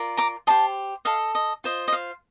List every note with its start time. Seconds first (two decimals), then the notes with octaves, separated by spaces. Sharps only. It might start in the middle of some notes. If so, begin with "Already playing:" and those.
Already playing: F4 A#4 D5
0.17 A#5 D6
0.47 G4 C5 D#5 A5 C6
1.05 A4 D#5 F5
1.35 D#5
1.64 F4 C5 D#5
1.88 D#5
1.93 F5